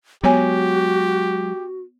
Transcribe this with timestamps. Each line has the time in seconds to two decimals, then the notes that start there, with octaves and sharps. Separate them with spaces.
0.24 F#3 G#3 B3 F#4 G4 C#5 G#5